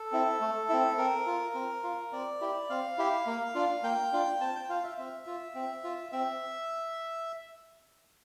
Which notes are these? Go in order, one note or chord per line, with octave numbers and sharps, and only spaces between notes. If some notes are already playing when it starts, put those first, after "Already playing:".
Already playing: A4
C4 E4
A3
C4 E4
C4 A#4
F4
C4
F4
C4 D5
E4 G4
C4 F5
E4 G4
A#3
D4 F4
A#3 G5
D4 F4
C4 A5
G5
F4 F5
E5
C4 E5
F4
C4
F4
C4 E5